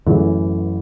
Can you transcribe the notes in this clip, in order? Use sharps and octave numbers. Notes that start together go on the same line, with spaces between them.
A1 F#2 A2 E3 C#4